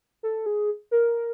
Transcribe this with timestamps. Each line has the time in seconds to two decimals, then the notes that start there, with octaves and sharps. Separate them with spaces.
0.23 A4
0.46 G#4
0.91 A#4